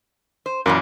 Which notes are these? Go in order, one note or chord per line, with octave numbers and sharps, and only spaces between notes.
C5
F#2 A#2 E3 A#3